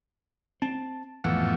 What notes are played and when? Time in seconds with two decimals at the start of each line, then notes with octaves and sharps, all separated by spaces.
0.62 C4 A5
1.24 G#1 F2 A2 E3 B3 F#5